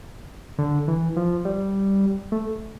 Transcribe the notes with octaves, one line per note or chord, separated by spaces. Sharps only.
D3
E3
F3
G3
A3